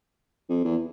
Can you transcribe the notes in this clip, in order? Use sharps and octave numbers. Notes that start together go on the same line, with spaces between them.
F2
E2